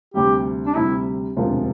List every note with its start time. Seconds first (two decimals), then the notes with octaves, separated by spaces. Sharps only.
0.14 D2 C3 G3 G4
0.67 D4
0.75 D2 C3 G3 E4
1.37 E1 D2 C3 F3 A#3